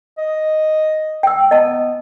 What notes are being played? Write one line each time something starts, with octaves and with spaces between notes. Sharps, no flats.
D#5
G5 E6
B3 D#5 A5